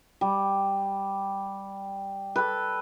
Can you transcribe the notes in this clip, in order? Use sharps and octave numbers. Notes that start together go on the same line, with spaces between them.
G3
A4 B4